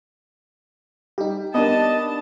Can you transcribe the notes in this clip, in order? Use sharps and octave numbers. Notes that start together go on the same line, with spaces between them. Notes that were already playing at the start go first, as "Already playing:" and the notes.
G3 D#4 G4
B3 D4 A#4 D#5 A5